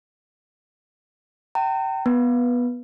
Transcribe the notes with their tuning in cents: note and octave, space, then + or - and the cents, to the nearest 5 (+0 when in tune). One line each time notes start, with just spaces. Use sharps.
G5 -30 A#5 -40
B3 -10 B4 -20